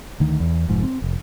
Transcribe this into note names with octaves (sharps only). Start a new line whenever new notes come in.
D2 D#3
E2
F1 G#2 F3
C4
F1